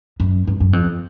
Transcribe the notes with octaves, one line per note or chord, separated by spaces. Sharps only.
F#2
G2
F#2
F2